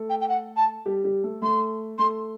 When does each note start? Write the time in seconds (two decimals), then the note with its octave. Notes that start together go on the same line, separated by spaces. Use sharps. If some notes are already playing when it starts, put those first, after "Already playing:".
Already playing: A3 A4
0.10 G5
0.21 G5
0.29 F#5
0.57 A5
0.86 G3 G4
1.04 G3 G4
1.24 A3 A4
1.42 A3 A4 C6
1.99 A3 A4 C6